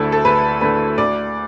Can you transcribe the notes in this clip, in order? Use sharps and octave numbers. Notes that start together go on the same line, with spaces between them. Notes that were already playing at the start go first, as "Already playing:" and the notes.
Already playing: D2 D3 A3 E4 A4
A4
D2 B4
D3 A3 B4
D2 D5